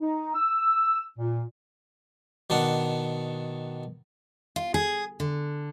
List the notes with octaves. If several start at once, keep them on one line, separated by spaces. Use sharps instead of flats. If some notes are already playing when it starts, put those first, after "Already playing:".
D#4
E6
A#2
B2 D#3 D4 F#5
F4
G#4
D3